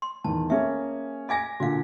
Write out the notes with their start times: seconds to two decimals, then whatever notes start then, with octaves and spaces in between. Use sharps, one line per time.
0.02 C6
0.24 E2 D#3 A5
0.50 A#3 C#4 G#4 E5
1.29 D#5 F5 G#5 D6 G#6 A#6
1.60 A#2 D3 F#4 F5